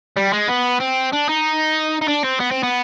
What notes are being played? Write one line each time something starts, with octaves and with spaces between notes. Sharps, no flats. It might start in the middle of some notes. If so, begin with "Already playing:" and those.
G3
G#3
B3
C4
D4
D#4
D#4
D4
C4
B3
C4
B3